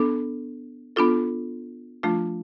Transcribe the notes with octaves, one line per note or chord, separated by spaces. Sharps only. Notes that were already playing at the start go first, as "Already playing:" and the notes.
Already playing: B3 D4 A4
B3 D4 F4 A4
F3 A3 D4 F4